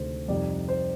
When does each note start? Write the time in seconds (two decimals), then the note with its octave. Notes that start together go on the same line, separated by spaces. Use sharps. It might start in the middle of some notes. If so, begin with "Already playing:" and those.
Already playing: D2 C3 D#3 G#3 C5
0.28 F2 C3 G3 C4 D#4 D5
0.68 C5